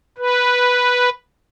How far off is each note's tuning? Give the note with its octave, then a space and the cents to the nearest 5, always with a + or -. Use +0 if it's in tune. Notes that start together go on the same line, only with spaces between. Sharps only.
B4 -5